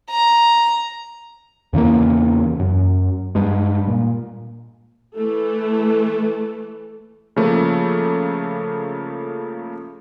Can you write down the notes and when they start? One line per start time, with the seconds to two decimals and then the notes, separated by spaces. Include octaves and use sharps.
0.10 A#5
1.73 E2 C#3 E3 A#3
2.59 F#2
3.35 G2 G#3
3.88 A#2
5.14 E3 A3 A4
7.36 C#3 F3 A3 A#3